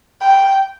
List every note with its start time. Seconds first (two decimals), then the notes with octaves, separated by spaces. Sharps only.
0.21 G5